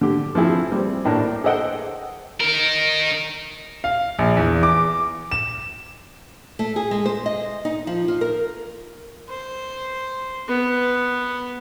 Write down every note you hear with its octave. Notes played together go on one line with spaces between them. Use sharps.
D3 G4
F3 C4 E4 G#4
G3 C4
A2 A#3 D4
G#4 A4 C5 D#5 F#5 G5
D#4 A#4
F5
A#1
E2
D6
E7
A3
G#4
G#3
C5
D#5
D#4
F3
F4
A#4
C5
B3